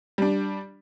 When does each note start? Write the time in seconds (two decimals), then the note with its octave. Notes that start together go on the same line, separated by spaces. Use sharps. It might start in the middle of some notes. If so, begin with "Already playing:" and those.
0.18 G3 D4